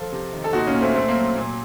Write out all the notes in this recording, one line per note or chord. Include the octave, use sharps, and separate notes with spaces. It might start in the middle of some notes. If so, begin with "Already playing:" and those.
Already playing: F3 F4 A4
C3
D#3
A4
A#2 D#4 F#4
A#3 C#4
A#2
A3 C4
A#2 A3 C4
A#3
F#3
A#2